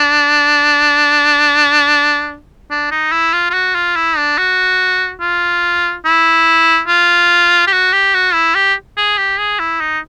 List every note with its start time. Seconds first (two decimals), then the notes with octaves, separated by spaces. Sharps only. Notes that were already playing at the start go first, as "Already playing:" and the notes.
Already playing: D4
2.71 D4
2.91 D#4
3.12 E4
3.33 F4
3.50 F4
3.54 F#4
3.75 F4
3.96 E4
4.17 D4
4.38 F#4
5.21 F4
6.05 E4
6.88 F4
7.67 G4
7.72 F#4
7.93 G4
8.14 F#4
8.34 E4
8.55 G4
8.97 G#4
9.18 G4
9.39 G#4
9.59 E4
9.80 D#4